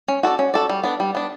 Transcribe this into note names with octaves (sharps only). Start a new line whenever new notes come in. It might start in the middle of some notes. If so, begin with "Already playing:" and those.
C#4
F#4 A4 D5
C#4
F#4 A4 D5
G3
B3 D4
G3
B3 D4